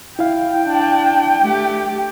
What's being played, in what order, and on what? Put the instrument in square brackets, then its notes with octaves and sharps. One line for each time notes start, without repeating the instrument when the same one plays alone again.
[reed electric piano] E4 F5 [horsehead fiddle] G5
[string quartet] D4
A3 G4